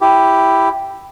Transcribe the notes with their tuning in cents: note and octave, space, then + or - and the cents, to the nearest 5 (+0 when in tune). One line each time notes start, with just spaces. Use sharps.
E4 +0 G4 +0